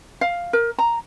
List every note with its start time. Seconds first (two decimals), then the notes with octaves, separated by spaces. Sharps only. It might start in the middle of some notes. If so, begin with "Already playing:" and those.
0.21 F5
0.53 A#4
0.78 A#5